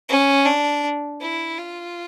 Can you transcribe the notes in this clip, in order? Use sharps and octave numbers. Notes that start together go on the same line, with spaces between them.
C#4
D4
E4
F4